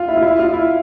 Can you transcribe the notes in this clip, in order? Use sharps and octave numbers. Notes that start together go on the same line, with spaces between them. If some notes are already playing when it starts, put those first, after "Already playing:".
Already playing: F4
E4
F4
E4
F4
E4